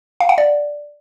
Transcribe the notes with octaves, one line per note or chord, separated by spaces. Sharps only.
F5
F#5
D5